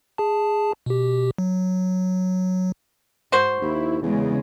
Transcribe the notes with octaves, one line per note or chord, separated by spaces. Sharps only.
G#4 A5
B2 G4
F#3
G#2 F#4 C5
D#2 E4
E2 C#3 G#3